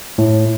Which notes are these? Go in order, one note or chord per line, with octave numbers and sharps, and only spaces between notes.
A2